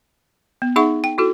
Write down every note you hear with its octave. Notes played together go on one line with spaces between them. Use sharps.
B3
D#4 G#4 E5 F#5 C#6
G5
E4 F#4 A4